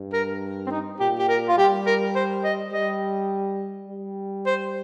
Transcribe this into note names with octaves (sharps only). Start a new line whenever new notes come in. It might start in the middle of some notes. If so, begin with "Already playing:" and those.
Already playing: G2
A#4
C4
D#4
A#2 G4
G4
A#4
F4
G3 G4
A#4
C5
D#5
G3 D#5
G3
C5